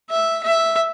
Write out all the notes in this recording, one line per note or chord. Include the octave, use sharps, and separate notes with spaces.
E5
E5